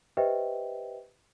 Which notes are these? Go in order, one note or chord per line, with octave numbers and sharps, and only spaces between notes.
G4 B4 C5 D#5 E5 G5